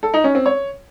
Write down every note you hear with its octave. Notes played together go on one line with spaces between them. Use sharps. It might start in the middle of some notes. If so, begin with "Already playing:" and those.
A4
D#4
C#4
C4
C#5